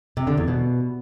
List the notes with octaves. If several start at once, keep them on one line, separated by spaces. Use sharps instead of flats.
C3
D3
E2
B2